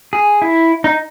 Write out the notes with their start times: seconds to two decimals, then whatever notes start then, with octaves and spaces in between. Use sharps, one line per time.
0.13 G#4
0.42 E4
0.84 D#4